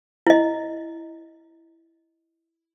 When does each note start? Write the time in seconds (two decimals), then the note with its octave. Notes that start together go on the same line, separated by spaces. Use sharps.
0.27 E4 D#5